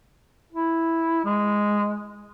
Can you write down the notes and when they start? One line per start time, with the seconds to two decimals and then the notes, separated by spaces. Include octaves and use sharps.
0.53 E4
1.25 G#3